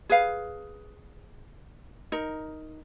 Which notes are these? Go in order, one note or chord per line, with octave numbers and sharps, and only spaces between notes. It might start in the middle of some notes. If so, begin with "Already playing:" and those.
G#4 B4 F5
D#4 A#4